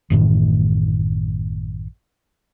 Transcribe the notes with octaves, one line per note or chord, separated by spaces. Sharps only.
A1 F#2 A2 D#3